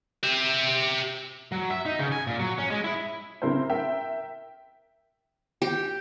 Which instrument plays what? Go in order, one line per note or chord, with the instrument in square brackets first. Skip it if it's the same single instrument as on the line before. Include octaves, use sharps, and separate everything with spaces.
[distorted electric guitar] G4 E5
[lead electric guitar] F#3
E5
D#4
C#3
G#5
A#2
F#3
C#4
G#3
E4
[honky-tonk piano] C#3 C4 E4 A#4 C5
A#4 E5 G5
[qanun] G4